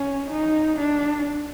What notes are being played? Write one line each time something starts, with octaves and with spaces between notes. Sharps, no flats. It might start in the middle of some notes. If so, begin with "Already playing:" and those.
Already playing: C#4
D#4
D4